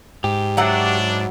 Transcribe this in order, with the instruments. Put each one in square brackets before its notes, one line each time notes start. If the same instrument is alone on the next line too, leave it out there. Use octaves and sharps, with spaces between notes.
[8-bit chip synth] G#2 [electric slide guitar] G4
[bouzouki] F#3 E4 F#5 [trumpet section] D4